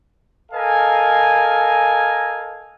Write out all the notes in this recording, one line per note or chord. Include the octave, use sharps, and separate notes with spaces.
A4 A#4 D#5 F5 G#5